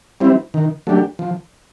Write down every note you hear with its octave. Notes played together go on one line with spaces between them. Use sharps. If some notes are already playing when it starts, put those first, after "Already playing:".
G3 C4 E4
D#3
F#3 A3 D4 G4
F3